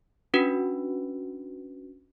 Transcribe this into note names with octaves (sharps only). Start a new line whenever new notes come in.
C#4 D4 F#4 B4